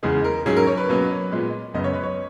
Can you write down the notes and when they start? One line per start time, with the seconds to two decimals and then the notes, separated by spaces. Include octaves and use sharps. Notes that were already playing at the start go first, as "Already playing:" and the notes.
0.03 E2 C#3 G#3 B3 G#4
0.24 A#4
0.46 G#2 F#3 C#4 G#4
0.57 A#4
0.67 C#5
0.77 B4
0.89 B2 F#3 A#3 C#4
1.32 A#2 G#3 B3
1.74 F#2 C#3 G#3 B3 D#5
1.84 C#5
1.94 B4
2.04 C#5